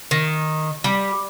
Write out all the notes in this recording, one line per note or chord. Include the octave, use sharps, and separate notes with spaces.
D#3
G3